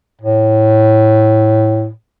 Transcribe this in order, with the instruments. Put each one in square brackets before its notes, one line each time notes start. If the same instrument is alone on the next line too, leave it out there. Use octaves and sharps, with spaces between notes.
[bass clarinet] A2